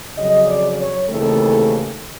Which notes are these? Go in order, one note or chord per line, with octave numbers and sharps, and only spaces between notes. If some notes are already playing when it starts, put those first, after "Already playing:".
F2 C#3 F#3 D#5
D5
C#5
D#2 C#3 E3 A3 C4 A4